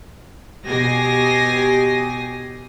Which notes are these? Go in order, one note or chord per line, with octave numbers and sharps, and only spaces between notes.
B2 G4 G#5 D#6 A#6 C7